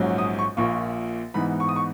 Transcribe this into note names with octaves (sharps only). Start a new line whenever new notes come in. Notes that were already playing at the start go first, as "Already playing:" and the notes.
Already playing: A#1 G#2 F#3 C#4
D#6
C#6
A#1 A#2 A#3 C#6
G#2 E3 B3 D#4 B5
C#6
D#6
C#6